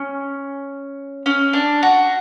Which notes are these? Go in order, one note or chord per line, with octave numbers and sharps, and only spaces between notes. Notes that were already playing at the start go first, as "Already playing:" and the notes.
Already playing: C#4
C#4
D4
F#4